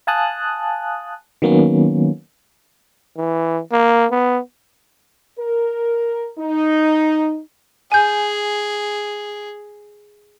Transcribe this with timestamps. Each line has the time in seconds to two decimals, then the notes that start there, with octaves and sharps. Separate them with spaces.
0.07 F5 G#5 A5 D#6 F#6
1.42 D#3 F#3 A#3 B3 C#4
3.17 E3
3.72 A#3
4.11 B3
5.39 A#4
6.39 D#4
7.92 G#4 G#5 G6